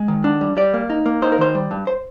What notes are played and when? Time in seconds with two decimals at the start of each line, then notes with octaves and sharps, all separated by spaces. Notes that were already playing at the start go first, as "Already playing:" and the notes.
Already playing: G#3
0.08 D#3
0.24 D4
0.41 G3
0.57 G3 D5
0.74 A#3
0.90 D#4
1.06 A#3
1.22 D#4 C5
1.32 A#4
1.38 D#3 C5
1.55 G3
1.71 G2
1.87 C5